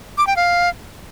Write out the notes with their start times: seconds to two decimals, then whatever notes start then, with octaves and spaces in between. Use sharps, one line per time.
0.18 D6
0.27 G5
0.36 F5